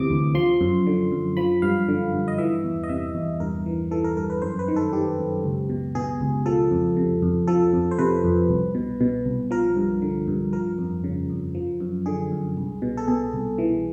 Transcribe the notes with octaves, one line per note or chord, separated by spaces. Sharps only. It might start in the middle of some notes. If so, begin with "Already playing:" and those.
Already playing: D2 C3 E3 D6 D#6
D2
F3 C6
F#2
D3
F#2
F3 B5
G2 F5
D3
G2
D#5
E3 E5
E2
D#5
C3 E5
E2
G2 A#4
E3
E3 A4
A#4
G2 A#4
B4
F#2 C5
B4
D#3
A4
D#3 G4
F#2
C#2
B2
B2 G#4
C#2
F3 A4
F2
C3
F2
F3 A4
F2
C5
C3 B4
F2
C2
B2
B2
C2
F3 A#4
G2
D3
G2
F3 A#4
F2
C#3
F2
F3
F#2
D3 G#4
F#2
C2
B2
A4
B2 G#4
C2
E3